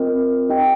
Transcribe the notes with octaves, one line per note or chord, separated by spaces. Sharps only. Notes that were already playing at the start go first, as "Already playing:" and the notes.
Already playing: C4 F4 A#4 D#5
D#4 G4 D#5 G5